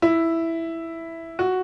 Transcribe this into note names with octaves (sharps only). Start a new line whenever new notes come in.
E4
F#4